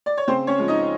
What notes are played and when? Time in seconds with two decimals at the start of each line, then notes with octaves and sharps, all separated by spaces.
0.06 D5
0.18 C#5
0.27 C#3 C4 C5
0.47 C#4 C#5
0.59 F3 G#3
0.68 D#4 D#5